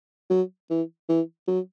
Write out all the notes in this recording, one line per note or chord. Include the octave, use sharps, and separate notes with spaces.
F#3
E3
E3
F#3